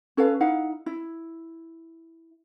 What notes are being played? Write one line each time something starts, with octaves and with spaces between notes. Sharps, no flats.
C#4 A4 B4 F5
D#4 E4 F5 F#5
E4